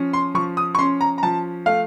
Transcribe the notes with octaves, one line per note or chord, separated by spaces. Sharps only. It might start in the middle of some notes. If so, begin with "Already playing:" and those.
Already playing: F3 C#4
C6
F3 C#6
D#6
C#6
C#4 C6
A#5
A#5
F3 A5
A3 F5